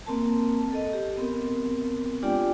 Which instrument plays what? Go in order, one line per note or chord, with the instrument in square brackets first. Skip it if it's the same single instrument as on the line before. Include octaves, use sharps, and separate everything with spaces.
[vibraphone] A#3 C4 A#4 A5
A4 D#5
G4
B3 C4 A#4
G#3 D4 F4 G4 D5 G5